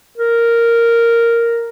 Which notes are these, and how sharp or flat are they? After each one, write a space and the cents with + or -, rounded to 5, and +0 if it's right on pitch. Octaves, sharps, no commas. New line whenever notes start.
A#4 -5